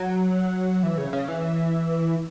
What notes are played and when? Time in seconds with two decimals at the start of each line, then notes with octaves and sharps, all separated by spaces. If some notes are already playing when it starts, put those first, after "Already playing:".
Already playing: F#3
0.83 E3
0.98 C#3
1.13 C#3
1.28 E3